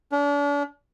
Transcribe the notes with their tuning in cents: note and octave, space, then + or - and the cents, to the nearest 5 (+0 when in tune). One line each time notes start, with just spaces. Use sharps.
D4 -40